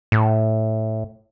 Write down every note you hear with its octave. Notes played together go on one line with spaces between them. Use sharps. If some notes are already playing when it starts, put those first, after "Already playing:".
A2